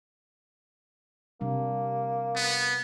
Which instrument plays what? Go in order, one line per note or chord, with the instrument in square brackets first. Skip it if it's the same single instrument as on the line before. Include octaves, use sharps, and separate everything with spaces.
[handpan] C3 G3 D4 [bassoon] A#3
[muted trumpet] B3